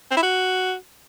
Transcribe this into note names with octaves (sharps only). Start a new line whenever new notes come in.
C4
E4
F#4